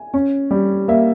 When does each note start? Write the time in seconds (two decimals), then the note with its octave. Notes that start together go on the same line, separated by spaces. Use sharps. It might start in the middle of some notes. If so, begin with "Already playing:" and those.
Already playing: G#5
0.14 C#4
0.51 G3
0.88 A#3 E5